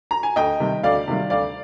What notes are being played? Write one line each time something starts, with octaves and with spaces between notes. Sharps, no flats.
A#5
G#5
D2 D#5 G5
C3 D#3 G3
D2 D5 F5
C3 D#3 G3
D2 D5 F5